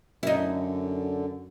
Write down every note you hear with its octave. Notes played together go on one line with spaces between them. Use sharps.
F#2 D3 D#4 E4